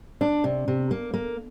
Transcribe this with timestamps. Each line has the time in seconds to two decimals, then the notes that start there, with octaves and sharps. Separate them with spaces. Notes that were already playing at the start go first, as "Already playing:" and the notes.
0.21 D4
0.44 C3
0.68 C3
0.91 A#3
1.14 A#3